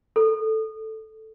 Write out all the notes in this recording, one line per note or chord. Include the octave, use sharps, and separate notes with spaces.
A4